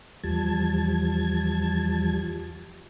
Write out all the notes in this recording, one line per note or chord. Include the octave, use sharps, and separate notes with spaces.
E2 F3 G3 A5 G#6